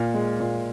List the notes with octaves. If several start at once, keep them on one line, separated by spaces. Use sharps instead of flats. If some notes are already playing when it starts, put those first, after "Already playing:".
Already playing: A#2 F5
G#3
A#2